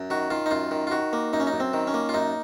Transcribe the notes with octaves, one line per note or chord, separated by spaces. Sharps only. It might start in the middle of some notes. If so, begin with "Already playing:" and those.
Already playing: F#2
D#3 F#4
D#3 F4
D#4
F#2 F4
D#3
F4
D#3 F#4
A#3
F#2 D#4
C#4
D#4
F#2
C4
D#3
C#4
A#3
F4
F#2 D#4